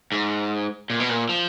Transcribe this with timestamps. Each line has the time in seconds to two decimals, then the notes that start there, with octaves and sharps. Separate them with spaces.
0.12 G#2
0.90 A#2
1.00 B2
1.10 A#2
1.29 F3